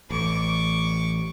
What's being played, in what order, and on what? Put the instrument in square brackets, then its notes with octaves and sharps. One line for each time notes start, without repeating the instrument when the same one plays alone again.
[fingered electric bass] A1 [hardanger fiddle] C#6 D6